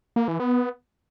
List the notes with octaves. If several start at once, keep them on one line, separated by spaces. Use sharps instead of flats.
A#3
E3
B3